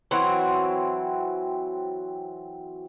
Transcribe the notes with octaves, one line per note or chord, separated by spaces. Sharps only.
E3 F#3 C4 F#4